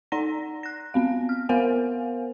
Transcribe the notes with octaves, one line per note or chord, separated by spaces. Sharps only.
D#4 D5 F#5 A#5 A#6
F#6 A#6
B3 C4 F5
F6
B3 A#4 C5 F5 F#5 G#5